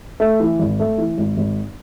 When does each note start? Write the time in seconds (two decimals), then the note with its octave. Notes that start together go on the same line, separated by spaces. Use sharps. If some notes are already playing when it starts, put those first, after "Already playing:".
0.20 A3
0.40 E3
0.59 G#1
0.80 A3
0.98 E3
1.18 G#1
1.37 G#1